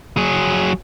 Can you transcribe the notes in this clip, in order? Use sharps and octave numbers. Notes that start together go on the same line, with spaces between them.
F#3 G#4